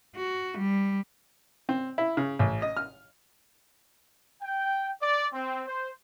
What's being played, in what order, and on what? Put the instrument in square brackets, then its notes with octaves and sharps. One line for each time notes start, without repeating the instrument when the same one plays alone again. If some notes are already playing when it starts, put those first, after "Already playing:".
[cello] F#4
G3
[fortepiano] C4
E4
C#3
A1
D#5
F6
[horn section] G5
D5
C4
C5